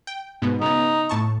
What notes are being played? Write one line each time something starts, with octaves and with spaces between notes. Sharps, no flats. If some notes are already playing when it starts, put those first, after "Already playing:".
G5
G#2 B2 B3
C#3 B3 D#4
A2 A5 C#6